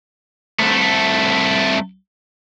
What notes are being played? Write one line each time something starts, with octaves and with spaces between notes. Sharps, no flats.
C2 A3